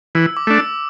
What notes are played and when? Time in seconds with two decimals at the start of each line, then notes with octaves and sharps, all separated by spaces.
0.15 E3 E6
0.37 D6
0.47 A3 D4
0.59 E6